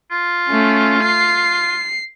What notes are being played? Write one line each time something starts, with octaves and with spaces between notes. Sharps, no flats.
F4
A3 C#4
C7